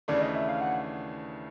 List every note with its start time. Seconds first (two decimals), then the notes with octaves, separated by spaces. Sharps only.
0.08 D#2 C#3 E3 A3 D4 D5
0.22 D#5
0.35 E5
0.48 F5
0.61 F#5